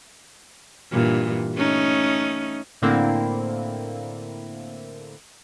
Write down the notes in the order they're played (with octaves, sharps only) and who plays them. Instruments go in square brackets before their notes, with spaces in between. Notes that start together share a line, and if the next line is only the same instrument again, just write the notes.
[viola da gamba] G2 A#2 E3
A3 C#4 D#4
[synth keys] A2 D3 A#3 C4 E4